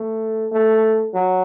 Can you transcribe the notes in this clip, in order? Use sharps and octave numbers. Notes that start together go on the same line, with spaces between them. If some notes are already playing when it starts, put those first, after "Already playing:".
Already playing: A3
A3
F#3